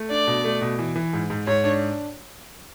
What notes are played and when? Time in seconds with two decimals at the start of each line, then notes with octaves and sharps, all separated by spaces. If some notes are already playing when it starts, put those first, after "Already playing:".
Already playing: A3
0.10 D4 D5
0.27 B2
0.44 A3
0.61 B2
0.79 E3
0.96 E3
1.13 G#2
1.30 G#2
1.47 G#2 C#5
1.64 D4